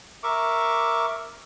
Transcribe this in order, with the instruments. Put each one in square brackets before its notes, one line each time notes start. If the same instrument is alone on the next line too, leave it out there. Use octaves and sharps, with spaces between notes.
[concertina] A#4 E5 C#6 D6